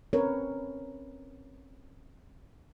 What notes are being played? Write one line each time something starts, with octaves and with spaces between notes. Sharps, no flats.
C4 C#4 A#4 B4 C#5